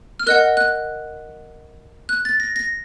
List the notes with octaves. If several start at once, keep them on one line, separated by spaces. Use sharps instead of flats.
F6
A#4 D#5 F#5 F#6
F#6
F#6
A6
A#6
A#6